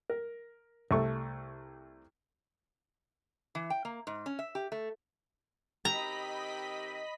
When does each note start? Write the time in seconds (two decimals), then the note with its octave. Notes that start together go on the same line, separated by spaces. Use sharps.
0.10 A#4
0.91 C2 A3 C#6
3.55 E3
3.70 G5
3.85 A#3
4.07 G#2
4.26 C#4
4.39 E5
4.55 G4
4.72 A3
5.85 D#3 C4 G4 D#5 A#5 B5 B6